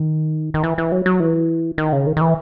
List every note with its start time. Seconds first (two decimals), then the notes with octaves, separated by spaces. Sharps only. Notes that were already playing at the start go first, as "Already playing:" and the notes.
Already playing: D#3
0.54 D#3
0.63 E3
0.78 E3
0.92 F#3
1.06 F#3
1.20 E3
1.78 D#3
1.93 C#3
2.07 D#3
2.17 D#3
2.21 E3